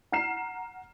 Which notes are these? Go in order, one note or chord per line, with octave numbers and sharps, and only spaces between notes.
F#5 A#5 F6 C7 E7